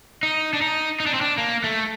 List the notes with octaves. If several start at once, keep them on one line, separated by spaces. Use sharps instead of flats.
D#4
D4
D#4
D#4
D4
C4
D4
A#3
A3